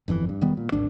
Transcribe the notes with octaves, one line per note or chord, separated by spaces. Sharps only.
G1 F2 D3 E3
G2
E1 D#3 G3 B3
A#2
D1 G#1 D4